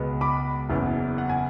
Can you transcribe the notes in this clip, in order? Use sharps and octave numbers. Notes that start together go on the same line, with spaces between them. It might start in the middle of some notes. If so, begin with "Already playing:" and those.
Already playing: C#2 B2 G#3 B3
B5 D6
F#1 E2 C#3
F#5
G#5